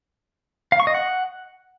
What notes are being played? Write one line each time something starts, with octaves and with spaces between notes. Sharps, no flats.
F5
C#6
D#5
F#5